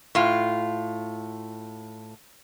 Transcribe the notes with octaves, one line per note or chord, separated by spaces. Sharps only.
A2 F4